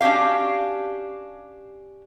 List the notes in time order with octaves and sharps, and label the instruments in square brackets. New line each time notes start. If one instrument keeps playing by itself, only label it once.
[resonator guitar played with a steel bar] C#4 D4 F#4 G4 F5